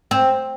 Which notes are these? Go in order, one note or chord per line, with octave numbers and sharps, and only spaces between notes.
C4